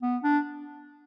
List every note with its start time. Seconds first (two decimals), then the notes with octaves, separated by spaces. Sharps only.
0.02 B3
0.23 D4